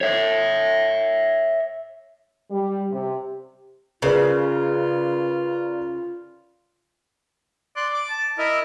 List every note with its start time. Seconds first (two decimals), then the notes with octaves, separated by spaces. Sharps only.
0.01 C#5 E5
2.51 G3
2.91 C3
4.02 C#3 F4 A#4 B4 D5
7.76 D5 C6 F#6
7.93 D6
8.10 A5
8.38 E4 A#4 D#5 E5